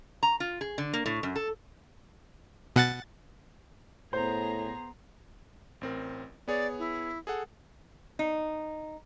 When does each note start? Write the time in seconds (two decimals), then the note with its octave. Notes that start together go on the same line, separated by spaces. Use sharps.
0.23 A#5
0.40 F4
0.61 G#4
0.78 D3
0.93 A#3
1.06 A2
1.23 F#2
1.36 A4
2.76 B2 F#5 A6
4.13 A2 B3 G#4 C5 A#5
5.81 A1 C4 A#4
6.48 B3 G#4 C#5 D5
6.79 E4
7.27 G#4 A4 F#5
8.19 D#4